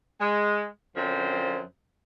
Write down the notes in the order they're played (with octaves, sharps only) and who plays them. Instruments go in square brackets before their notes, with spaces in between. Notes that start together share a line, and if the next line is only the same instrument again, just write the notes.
[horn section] G#3
F#2 D3 F3 C4 C5